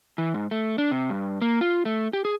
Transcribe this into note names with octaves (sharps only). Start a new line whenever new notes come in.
E3
G#2
A3
D4
C3
G2
A#3
F4
A3
G4
G#4